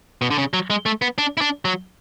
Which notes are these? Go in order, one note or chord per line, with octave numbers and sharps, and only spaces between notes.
B2
D3
C#3
F#3
G#3
A3
B3
D4
E4
D4
F#3